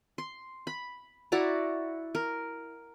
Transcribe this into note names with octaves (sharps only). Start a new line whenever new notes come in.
C6
B5
E4 F#4 D5 A#5
A#4